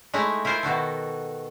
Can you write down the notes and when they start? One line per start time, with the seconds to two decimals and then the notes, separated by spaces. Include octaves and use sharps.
0.14 G#3 A3 D#4 E4
0.45 E4 F4 A#4 C5
0.63 B2 D#3 F#4 A4